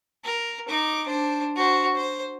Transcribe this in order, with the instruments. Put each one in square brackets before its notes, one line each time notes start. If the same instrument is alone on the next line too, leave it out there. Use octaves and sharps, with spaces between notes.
[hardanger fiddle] A#4
D#4 D6
D4 C5
F#4 C5
C5